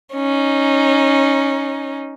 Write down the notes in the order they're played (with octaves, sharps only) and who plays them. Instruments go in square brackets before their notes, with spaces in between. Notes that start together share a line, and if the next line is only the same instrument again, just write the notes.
[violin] C#4 D#4